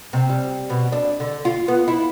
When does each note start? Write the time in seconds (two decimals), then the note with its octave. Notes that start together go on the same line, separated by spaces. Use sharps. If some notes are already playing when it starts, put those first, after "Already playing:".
0.13 C3
0.30 G3
0.70 B2
0.92 D4
1.20 D3
1.45 F4
1.68 B3
1.88 E4